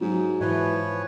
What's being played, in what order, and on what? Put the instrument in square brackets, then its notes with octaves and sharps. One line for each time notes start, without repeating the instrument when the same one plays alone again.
[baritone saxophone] G#2 [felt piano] F#3
[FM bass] G#2 [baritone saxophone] E3 [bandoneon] F3 B4 C#5